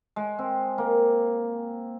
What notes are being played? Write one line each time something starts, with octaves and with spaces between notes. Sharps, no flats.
G#3
C4
A#3